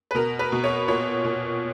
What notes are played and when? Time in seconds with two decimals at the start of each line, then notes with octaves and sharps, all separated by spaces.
0.11 B4
0.15 B2 A#4
0.39 B4
0.52 B2
0.64 C#5
0.88 A#2 C#5
1.24 A#2